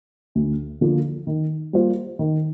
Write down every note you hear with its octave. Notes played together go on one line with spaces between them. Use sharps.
D2
D3 F3 A#3
D#3
G3 A#3 F4 C5
D#3